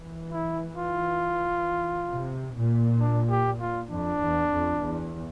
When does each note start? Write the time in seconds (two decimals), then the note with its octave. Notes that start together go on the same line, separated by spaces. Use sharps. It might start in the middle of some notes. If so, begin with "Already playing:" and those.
Already playing: E3
0.32 E4
0.76 F4
2.10 C3
2.55 A#2
3.00 D4
3.30 G4
3.60 F4
3.89 F2 D4
4.20 E2
4.49 F2
4.79 E2